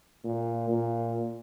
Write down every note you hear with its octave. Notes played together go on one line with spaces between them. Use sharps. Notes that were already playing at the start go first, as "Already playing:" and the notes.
A#2
A#2